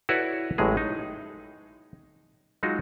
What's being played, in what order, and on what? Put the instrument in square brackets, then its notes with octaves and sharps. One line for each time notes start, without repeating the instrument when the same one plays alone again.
[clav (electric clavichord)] E4 F#4 A4 B4 C#5 D5
A1 A2 F#3 G#3 G#4
D#4
F#3 G#3 D#4 F4 F#4